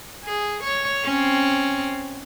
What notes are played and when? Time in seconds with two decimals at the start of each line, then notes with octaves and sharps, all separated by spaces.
0.25 G#4
0.64 C#5
1.04 C4 C#4